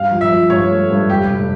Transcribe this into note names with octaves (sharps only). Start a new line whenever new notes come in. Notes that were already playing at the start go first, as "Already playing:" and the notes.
Already playing: G2 F5
F3
E5
F3
G2 C#5
A3
G2
F1 G4
F1